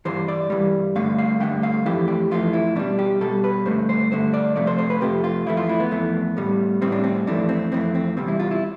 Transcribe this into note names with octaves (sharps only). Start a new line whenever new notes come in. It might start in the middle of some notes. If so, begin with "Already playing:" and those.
G2 E3 G3 C5
D5
G2 E3 G3
G2 D3 A3 F5
F5
G2 D3 A3 G5
F5
F2 E3 A3 G4
G4
F2 E3 A3 F4
E4
B2 G3 D4
G4
B2 G3 A4
B4
G2 D3 A3 C5
C5
G2 D3 A3 C5
D5
F2 C3 F3 A3 D5
C5
C5
B4
F2 C3 F3 A3 G4
F4
F2 E3 A3 E4
F4
E4
B3
F2 E3 A3
A2 G3
A2 G3 C4
D4
C4
F2 E3 A3 D4
C4
F2 E3 A3 C4
C4
E2 C3 G3 C4
E4
F4
E4